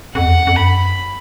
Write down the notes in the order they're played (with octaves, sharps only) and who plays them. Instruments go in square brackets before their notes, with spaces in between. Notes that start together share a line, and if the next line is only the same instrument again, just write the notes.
[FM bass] F2 [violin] F#5
[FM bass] E2
F2
F2
[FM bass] F#2 [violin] B5